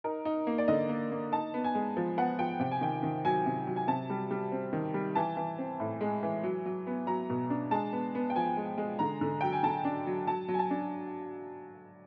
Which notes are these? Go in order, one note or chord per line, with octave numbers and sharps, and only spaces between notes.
D#4 A#4
D#4
A#3
D5
D3 D#5
A#3
A#3
D#4 A5
B3
G#5
G#3
F3
B3 F#5
F3 G5
C3 G5
G#5
D#3 G5
D#3
F#3 G#5
C3
F#3
G#5
C3 A5
G3
G3
C4
D#3
G3
E3 A5
E3
C4
A2
G#3
E3
F#3
F#3
B3
F#3 A#5
B2
D4
G#3 A5
B3
B3
G5
F3 G#5
G#3
G#3
D3 A#5
D3
F#3 G5
G#5
D3 A5
D4
F#3
F#3 A5
F#3
G#5
A5
D4